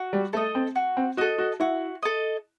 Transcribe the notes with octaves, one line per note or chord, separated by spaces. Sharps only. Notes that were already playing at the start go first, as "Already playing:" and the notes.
Already playing: F#4
G3
A3 A4 D#5
C4
F#4
C4
F#4 A4 D#5
F#4
E4 F#4
A4 D#5